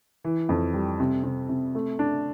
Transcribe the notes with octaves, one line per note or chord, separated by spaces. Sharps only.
E3
F2
G3
C3
C3
C3
A3
D4